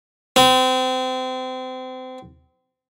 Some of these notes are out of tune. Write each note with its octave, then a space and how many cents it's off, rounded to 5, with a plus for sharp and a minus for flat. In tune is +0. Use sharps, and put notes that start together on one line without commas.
C4 -30